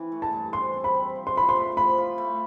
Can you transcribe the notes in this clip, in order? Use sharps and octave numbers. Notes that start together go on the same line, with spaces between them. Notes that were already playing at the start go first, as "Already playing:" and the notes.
Already playing: E3 C4
A3
A5
G2
C4 C6
C4
B5
C4
F3
C6
F3 B5
C6
A3
F3 B5
F4
A3